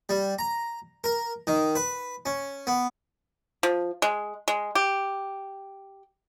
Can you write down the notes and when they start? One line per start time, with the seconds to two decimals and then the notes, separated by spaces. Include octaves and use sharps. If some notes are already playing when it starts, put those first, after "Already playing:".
0.09 G3
0.39 A#5
1.04 A#4
1.47 D#3
1.76 B4
2.26 C#4
2.67 B3
3.63 F3
4.02 G#3
4.48 G#3
4.75 G4